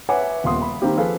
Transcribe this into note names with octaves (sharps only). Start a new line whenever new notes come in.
B4 C#5 E5 F#5 G#5 D6
D#1 B3 F4 C6 D#6
B5
D#3 A#3 C4 G4
F3 G#4 A4 B4 F5